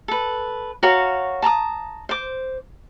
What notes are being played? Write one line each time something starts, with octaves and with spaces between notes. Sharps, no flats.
A4 B4
F#4 A#4 C#5 F5
A5 A#5 C6 D#6
C5 D6